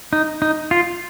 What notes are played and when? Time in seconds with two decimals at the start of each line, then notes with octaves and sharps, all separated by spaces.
0.13 D#4
0.42 D#4
0.71 F4